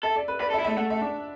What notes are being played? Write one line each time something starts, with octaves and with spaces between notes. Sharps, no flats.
A4 E5
D5
B4
B4 D5
A4
E5
E4
A3 E5
A3 F#5
E5
D4